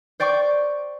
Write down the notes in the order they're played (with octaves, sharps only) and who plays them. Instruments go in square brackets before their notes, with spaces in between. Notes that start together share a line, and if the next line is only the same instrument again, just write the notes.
[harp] C5 D5 G5 C#6 D6